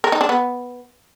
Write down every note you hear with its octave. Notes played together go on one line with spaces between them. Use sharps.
A#4
D#4
D4
B3